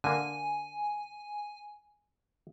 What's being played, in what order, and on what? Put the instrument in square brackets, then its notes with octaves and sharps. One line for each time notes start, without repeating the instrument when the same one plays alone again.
[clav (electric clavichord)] D3 A#3 [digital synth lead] G#5